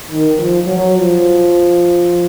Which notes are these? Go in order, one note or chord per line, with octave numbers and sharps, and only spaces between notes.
D#3
F3
F#3
F3